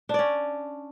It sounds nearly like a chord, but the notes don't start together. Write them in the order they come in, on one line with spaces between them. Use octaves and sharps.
D4 D5 C#4